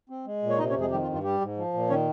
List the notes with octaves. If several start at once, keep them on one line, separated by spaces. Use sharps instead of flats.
C4
G#3
A#2
C#5
C3 D#4 D#5
C#4 C#5
F2
G#3 G#4
D#3 G3 G4
F4
G2
F4
G3 G4
G#2
F3
A#2
D#3 C#4 C#5